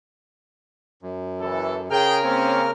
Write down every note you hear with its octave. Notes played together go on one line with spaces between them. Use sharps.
F#2
F#1 E3 A4
C#3 G#4 A#4 G5 F6
A#3 C4 C#4